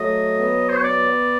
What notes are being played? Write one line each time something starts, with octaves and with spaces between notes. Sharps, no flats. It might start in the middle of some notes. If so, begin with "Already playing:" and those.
Already playing: F#3 A3 D#5
B3
C5
C#5
B3 D5